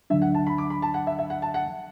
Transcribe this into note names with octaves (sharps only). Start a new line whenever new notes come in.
D2 D3 F#3 D4 E5
F#5
A5
B5
D6
B5
A5
F#5
E5
E5
F#5
A5
F#5